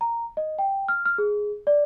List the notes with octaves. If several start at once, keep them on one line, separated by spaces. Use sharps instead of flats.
A#5
D#5
G5
F6
F6
G#4
D5